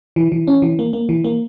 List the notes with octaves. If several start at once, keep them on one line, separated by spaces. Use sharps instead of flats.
E3
E3
C#4
E3
A#3
A#3
E3
A#3